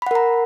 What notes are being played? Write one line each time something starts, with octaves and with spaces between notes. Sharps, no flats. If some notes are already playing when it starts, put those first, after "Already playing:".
A#4 F#5 A#5 B5